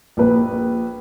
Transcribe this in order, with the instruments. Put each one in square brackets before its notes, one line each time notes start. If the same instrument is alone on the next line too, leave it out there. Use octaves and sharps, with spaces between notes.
[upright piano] A#1 B4